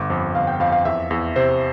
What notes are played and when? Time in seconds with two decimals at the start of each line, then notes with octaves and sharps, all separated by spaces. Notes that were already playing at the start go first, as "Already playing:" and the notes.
Already playing: G1 D6
0.10 F2
0.35 G1 F5
0.47 G5
0.60 F2 F5
0.72 F5
0.85 E2 E5
1.11 E2
1.36 C3 C5